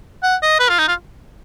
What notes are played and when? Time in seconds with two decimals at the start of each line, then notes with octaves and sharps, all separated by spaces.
0.23 F#5
0.42 D#5
0.59 B4
0.69 F4
0.79 D#4
0.88 F4